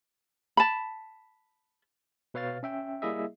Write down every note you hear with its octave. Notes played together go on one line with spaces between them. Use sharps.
A5 B5
B2 B4 C#5 F5 F6 A6
C#4 E5 G5
G3 A#3 E4 G#4 D#5 E5